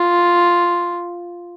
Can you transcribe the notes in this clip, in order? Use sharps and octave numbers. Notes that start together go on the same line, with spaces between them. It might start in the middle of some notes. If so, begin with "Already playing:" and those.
Already playing: F4